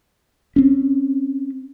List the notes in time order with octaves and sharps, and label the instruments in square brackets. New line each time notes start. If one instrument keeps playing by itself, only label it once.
[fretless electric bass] C4 C#4